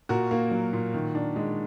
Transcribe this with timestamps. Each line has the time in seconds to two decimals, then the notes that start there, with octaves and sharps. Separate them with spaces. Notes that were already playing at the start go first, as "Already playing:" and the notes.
0.09 A#2 F#4 A#4
0.31 A#3
0.51 F#3
0.73 A#2
0.94 D#3
1.15 D4
1.36 G#3